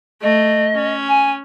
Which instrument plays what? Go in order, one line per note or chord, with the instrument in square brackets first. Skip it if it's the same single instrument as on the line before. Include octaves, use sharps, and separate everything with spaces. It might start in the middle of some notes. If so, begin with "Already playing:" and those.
[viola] A3 [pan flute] D#5
[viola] C#4
[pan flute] G#5